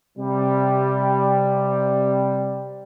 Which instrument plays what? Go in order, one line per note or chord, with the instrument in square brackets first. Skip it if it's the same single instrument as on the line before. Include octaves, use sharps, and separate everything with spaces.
[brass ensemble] C3 G3